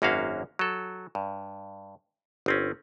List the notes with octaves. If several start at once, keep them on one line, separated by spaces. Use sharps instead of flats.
G#1 F#2 A#3 C#4 F#4 F5
F#3 A4
G2
G1 C4 C#4